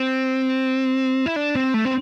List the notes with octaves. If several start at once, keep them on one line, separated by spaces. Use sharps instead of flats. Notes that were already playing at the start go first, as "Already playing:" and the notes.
Already playing: C4
E4
D4
C4
A3
C4